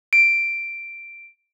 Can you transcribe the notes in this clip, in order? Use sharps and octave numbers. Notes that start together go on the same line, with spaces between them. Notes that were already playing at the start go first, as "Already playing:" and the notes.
D7